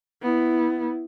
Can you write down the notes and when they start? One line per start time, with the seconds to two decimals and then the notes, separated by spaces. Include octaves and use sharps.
0.23 B3 E4